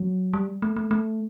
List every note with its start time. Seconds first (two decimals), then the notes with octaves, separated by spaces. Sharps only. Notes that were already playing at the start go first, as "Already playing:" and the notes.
Already playing: F#3
0.33 G3
0.62 A3
0.76 A3
0.91 A3